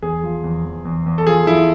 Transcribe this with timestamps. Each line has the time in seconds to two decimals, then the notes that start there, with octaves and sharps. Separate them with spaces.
0.02 E2 G#4
0.23 F3
0.44 E2
0.65 E2
0.85 E2
1.06 E2
1.18 A4
1.27 F3 G#4
1.47 F3 E4